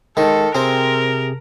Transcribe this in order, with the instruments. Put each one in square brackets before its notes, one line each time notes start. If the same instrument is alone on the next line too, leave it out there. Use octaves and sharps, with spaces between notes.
[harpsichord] D#3 [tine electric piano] G#3 [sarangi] A4
[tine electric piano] C3 G#4 [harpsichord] C4 [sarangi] A#4